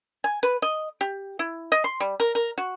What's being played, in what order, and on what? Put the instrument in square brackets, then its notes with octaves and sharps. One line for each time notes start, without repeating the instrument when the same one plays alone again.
[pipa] G#5
B4
D#5
G4
E4
D#5
C6
G3
A#4
A#4
F#4